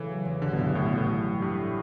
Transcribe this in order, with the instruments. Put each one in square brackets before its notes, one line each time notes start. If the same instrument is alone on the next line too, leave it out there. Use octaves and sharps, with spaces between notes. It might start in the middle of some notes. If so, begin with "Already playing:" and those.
Already playing: [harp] C#3 A3 [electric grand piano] E3
[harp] F#3
E2
[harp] A1 [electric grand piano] D3
[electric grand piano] B2
[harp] G2
[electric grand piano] A2 [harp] F#3
[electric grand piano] B2
[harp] A1
[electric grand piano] A2
[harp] E4
G3
[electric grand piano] G2 [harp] C#4
[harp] A2